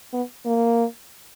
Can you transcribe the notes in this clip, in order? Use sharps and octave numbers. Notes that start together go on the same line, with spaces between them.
B3
A#3